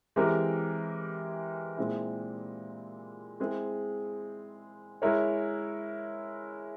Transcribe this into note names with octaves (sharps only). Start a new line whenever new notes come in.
E3 G#3 C4 G4 A#4
A#2 G#3 C4 E4
G#3 C4 E4 G#4
G#3 E4 A#4 C#5